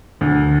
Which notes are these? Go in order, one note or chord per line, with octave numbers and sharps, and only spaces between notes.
D2